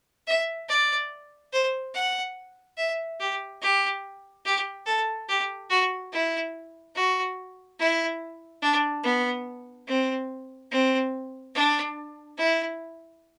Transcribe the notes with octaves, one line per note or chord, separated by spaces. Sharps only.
E5
D5
C5
F#5
E5
G4
G4
G4
A4
G4
F#4
E4
F#4
E4
D4
B3
C4
C4
D4
E4